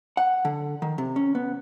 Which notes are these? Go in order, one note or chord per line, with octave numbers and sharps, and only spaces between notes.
F#5
D3
D#3
C3
C#4
B3